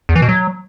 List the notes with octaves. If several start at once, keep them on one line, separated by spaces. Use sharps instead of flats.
E2
E3
B2
F#3